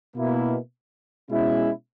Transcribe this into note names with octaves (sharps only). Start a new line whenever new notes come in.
B2 A#3 E4
B2 G#3 C#4 E4